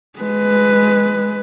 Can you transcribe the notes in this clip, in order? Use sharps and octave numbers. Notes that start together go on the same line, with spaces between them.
G#3 B4